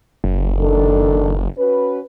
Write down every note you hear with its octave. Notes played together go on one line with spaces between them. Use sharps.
F#1
D#3 D4 A4
C#4 F#4 B4